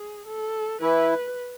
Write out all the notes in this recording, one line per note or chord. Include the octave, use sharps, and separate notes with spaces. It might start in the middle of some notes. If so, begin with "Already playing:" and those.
Already playing: G#4
A4
E3 E4 B4